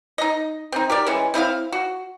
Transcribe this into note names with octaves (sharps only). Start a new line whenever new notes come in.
D#4 D#5
C4 D#4
G4 A#4 D5
E3 G#3 C#4
C4 E4 D#5 F5
F#4